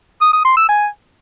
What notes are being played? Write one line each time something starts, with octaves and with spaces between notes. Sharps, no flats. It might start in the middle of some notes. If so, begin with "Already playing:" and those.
D#6
D#6
C6
E6
G#5